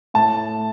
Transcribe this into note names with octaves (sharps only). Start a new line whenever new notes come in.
A2 A3 A5